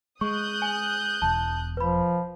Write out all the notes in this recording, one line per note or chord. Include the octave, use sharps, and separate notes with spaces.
G#3 C#6 D#6 F#6 G6
G#5 F#7
E1 E2 A5
F3 B4 B5